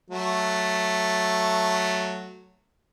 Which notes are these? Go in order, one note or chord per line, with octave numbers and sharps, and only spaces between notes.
F#3 A3